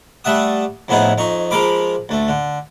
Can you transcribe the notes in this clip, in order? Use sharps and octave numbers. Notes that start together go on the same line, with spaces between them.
G3 A3 E5 F#5 D#6
F2 A2 B3 D#4 E4 G#4
F2 D#4 C#6
F3 G#3 A#4 F5 B5 D6
D2 A3
D3